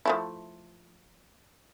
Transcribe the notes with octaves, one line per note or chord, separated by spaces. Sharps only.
F3 A3 E4